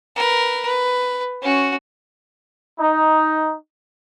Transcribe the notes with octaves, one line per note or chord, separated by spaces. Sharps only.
A#4 B4
B4
C#4 F#4
D#4